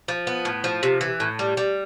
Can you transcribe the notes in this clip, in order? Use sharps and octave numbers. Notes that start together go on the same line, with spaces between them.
F3
B3
A2
F3
C3
E3
A2
G3
G3